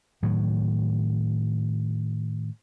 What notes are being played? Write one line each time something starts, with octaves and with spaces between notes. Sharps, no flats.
A2 D#3 F#3